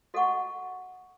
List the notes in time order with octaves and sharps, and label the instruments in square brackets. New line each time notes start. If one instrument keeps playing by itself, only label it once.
[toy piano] F#4 A4 D#5 F#5 C#6